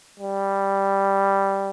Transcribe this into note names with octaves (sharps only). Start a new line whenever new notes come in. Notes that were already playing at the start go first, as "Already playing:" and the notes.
G3